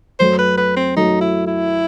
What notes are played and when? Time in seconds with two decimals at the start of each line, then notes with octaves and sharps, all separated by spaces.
0.20 F#2 F#3 A3 C5
0.39 B4
0.58 B4
0.77 C4
0.97 F#2 F#3 A3 D#4
1.21 E4
1.47 E4